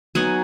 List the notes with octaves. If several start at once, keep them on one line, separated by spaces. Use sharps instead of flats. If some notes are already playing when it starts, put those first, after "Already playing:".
F#3 B3 D#4 F#5 G#5